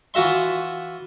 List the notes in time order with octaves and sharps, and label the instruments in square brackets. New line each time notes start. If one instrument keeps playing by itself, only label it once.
[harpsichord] E3 F4 F#4 E5 C6